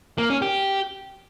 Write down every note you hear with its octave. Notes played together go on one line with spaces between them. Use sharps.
A#3
C#4
G4